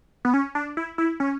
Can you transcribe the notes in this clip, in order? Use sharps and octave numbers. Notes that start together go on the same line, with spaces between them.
B3
C#4
D4
E4
E4
C#4